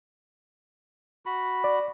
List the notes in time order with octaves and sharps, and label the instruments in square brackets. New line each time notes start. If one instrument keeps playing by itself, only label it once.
[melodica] F#4 B5
[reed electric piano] D5